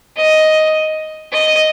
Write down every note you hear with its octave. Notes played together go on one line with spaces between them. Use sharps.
D#5
D#5